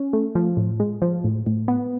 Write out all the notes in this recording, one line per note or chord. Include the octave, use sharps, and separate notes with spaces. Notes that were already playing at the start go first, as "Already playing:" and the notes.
Already playing: C#4
A3
F3
A2
G#3
F3
A2
A2
B3